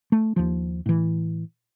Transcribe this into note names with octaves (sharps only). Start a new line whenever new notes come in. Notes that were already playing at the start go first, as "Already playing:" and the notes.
A3
D#2 F3
A2 E3